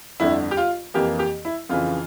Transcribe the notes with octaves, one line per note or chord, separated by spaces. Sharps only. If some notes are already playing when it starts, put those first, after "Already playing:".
G1 F2 D3 E4
G4
F4
F2 E3 A#3 G4
G4
E4
F2 C#3 E3 F4